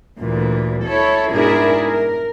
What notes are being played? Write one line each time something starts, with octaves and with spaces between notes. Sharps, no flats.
D2 A#2 E3 A3
E4 A4 C#5
G#2 B2 D4 E4 G#4 A#4
A#4